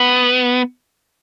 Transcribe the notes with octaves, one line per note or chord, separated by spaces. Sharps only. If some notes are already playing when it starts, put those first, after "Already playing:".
Already playing: B3